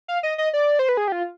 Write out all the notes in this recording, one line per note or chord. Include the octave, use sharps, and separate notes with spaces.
F5
D#5
D#5
D5
C5
B4
G#4
G4
F4